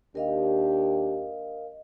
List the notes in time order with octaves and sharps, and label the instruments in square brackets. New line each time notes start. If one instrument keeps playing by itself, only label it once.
[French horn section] D#2 D4 G4 [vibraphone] A#4 D#5 F5